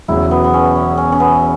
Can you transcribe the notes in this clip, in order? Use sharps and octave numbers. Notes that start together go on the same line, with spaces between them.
E1 E2 C#3 F#3 E4
B3
B3
C#4
C#4
C#4
C#4
B3